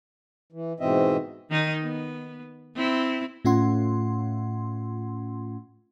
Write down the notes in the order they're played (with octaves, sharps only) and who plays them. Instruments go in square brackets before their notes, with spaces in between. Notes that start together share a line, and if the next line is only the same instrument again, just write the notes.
[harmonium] E3
G#2 B2 E3 C4 D#5 E5
[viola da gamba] D#3 D#4
B3
C4 E4
[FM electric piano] A2 A3 C#4 F4 F#5 C6